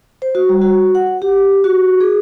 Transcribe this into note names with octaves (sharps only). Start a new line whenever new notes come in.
C5
F#4
G3
F#4
F#5
G4
F#4
G#4